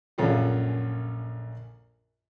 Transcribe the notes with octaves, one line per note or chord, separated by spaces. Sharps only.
A#1 F#2 C#4 F4 G#4 A4